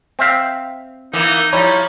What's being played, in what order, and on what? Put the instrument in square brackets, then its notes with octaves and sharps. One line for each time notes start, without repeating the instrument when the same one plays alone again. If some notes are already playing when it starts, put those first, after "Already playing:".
[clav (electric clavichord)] C4 E5 F5
[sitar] E3 A#3 B3 [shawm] D#4
[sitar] F3 G3 E4 [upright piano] C#5 A#5 B5